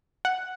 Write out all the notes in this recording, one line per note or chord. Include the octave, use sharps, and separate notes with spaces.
F#5